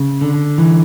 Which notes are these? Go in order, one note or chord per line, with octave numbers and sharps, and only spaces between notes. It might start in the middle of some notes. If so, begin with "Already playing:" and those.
Already playing: C#3
D3
E3